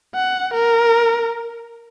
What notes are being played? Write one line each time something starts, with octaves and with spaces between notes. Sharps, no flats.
F#5
A#4